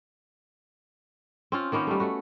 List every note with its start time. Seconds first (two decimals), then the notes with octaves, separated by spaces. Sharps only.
1.52 C4 C#4 F4
1.72 D#3 A#3 B3 C#4
1.87 G3 A3
2.00 A3 F#4